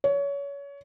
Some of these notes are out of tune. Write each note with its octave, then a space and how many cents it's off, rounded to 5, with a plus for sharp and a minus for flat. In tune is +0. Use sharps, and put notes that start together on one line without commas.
C#5 +25